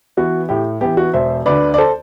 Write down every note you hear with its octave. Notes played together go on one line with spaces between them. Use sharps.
E3 B3 F#4
A2 G4
E3 B3 G4
F#4
E1 C5 E5
D2 D3 B4 D5
D5
A4 C5